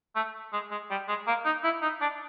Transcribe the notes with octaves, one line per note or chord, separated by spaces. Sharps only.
A3
G#3
G#3
G3
G#3
A#3
D#4
E4
D#4
D4